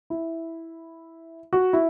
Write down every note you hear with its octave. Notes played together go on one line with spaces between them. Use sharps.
E4
F#4
E4